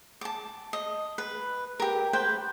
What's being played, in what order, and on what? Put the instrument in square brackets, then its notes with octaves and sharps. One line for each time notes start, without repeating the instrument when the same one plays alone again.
[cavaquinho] A5 D6
D#5
B4
G4 A#4
B4 C5 G5